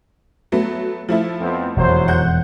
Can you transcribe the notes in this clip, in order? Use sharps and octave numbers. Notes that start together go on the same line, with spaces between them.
F#3 A3 B3
F3 A3 E4
F2 B3 C4
E1 C2 F2 F#3 C5
F#5 G6